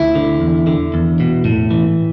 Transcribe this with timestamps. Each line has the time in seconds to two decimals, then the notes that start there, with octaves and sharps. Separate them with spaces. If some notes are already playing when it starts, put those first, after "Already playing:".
Already playing: D2 E4
0.15 D3
0.41 E2
0.67 D3
0.94 E2
1.20 B2
1.45 A2
1.71 E3